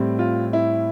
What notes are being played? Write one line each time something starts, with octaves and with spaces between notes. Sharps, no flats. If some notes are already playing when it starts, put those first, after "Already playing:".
Already playing: A2 G3 C4
F4
E4